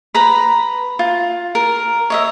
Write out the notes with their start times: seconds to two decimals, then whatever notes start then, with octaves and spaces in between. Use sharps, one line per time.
0.14 B4 A#5 B5
0.99 F4
1.55 A#4
2.10 C#5 D#5 E5